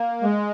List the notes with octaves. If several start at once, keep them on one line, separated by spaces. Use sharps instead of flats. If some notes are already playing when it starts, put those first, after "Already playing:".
Already playing: A#3
G#3